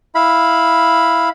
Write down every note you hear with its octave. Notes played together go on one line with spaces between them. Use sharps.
E4 F5 B5